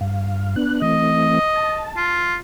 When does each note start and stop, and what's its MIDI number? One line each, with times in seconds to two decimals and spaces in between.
0.01 0.56 43
0.01 0.56 77
0.56 0.82 59
0.56 0.82 62
0.56 0.82 90
0.82 1.39 52
0.82 1.39 57
0.82 1.39 60
0.82 1.89 75
1.56 2.18 81
1.97 2.37 65